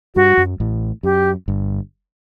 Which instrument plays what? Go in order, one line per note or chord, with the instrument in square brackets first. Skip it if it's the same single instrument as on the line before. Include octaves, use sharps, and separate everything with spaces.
[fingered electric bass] G2 G3 [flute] F#4
[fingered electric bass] F#2 F#3
A1 A2
[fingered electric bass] F#2 [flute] G4
[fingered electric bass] G1 G2